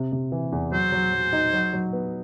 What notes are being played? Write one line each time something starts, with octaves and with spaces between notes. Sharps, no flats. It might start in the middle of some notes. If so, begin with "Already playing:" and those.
Already playing: C3
C3
E3
E2
F#3 C5
F#3
F#3
D#4
F#3
F#3
B3